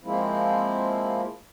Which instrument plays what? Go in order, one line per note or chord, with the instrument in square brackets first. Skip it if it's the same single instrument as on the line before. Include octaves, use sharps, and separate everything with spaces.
[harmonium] F3 G#3 A#3 C4 E4